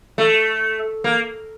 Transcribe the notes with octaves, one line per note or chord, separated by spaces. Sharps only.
A3
A#3